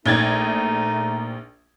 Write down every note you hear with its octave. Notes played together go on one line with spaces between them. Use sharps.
A#1 A3 D#4 G#6 A6